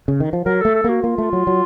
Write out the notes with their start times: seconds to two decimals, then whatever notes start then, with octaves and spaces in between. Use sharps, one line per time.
0.08 C#3
0.20 D#3
0.33 F3
0.45 F#3 A#4
0.60 A3 A4
0.75 A4
0.84 A#3 F#4
1.03 A#3 F4
1.18 A3
1.33 F#3
1.47 F#3